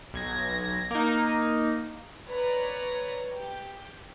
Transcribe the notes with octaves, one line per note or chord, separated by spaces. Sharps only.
B1 G#6 A#6
A#3 D#4
B4 C#5 D5 A#5
G4